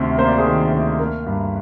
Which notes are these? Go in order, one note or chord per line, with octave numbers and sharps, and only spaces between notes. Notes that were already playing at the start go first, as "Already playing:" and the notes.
Already playing: D2 C3 D#3
A#3 C5
D5
G#4 C5
D#3
D2
A#3 A#4
G2